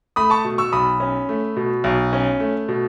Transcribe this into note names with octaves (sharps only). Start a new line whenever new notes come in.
A3 B5 D#6
A5 C#6
B2
C#6 E6
B1 B5 D#6
C#4
A3
B2
B1
C#4
A3
B2